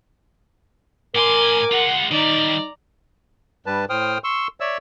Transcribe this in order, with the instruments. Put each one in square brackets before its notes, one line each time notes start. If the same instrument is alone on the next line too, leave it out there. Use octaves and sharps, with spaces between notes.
[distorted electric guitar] A2 C6 [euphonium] A#4 [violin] G#5 D6
[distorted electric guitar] G#3 F4 [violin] F#5
[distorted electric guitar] D#3 G3 [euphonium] D#4 [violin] D5 A#5
[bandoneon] G2 G3 B4 A5
A2 C5 G5 D#6 F6
C6 C#6 E6
C#5 D5 E5 E6